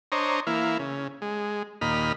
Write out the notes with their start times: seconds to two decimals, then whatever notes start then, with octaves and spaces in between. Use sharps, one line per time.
0.12 D4 C5 C#5 D#5 A#5
0.47 E3 A#3 E4 F5
0.79 C#3
1.22 G#3
1.81 D#2 A#2 D#5 B5 F6